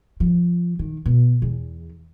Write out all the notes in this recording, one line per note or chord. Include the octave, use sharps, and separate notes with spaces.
F3
D#3
B2
E2